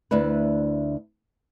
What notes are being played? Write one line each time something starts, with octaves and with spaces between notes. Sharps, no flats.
D2 D4 E4 B4